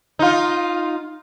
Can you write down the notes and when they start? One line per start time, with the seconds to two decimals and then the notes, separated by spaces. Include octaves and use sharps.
0.19 D#4 F4